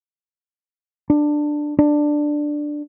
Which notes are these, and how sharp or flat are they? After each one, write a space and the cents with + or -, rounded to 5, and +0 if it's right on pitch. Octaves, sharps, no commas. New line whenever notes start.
D4 +10
D4 +10